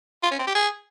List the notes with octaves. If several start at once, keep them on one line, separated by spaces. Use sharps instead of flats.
F4
C#4
C4
G4
G#4